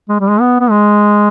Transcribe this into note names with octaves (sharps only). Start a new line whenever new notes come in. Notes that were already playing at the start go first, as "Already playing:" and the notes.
G#3
G3
G#3
B3
B3
G#3